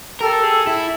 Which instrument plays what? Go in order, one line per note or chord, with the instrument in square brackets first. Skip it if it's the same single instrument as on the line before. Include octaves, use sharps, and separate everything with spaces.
[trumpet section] G4 A4 [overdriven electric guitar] A#4
[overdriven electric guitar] G#4
E4